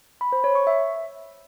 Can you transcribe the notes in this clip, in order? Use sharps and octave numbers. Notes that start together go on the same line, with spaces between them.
B5
C5
C#5
C#6
E5